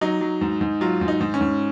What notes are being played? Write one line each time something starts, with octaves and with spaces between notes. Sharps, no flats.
F#3 D#4
F#3
G#2
G#2
F#3 F4
G#2
D#4
G#2
C#4
G#2